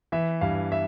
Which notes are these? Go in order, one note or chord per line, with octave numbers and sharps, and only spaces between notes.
E3 E5
G2 F5
E5